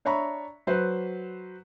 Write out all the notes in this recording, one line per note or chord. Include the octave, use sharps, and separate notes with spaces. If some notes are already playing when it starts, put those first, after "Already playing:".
D4 C#5 E5 A#5 B5 C#6
F#3 B4 C5